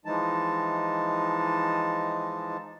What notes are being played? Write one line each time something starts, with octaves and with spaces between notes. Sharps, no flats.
E3 F3 G#3 D#4 A5